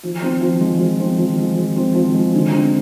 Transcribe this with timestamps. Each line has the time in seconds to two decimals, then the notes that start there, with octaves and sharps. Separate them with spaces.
0.03 F3
0.22 C4
0.41 F3
0.61 G#3
0.79 F3
1.00 C4
1.18 F3
1.37 G#3
1.57 F3
1.76 C4
1.95 F3
2.14 G#3
2.34 D3
2.53 C4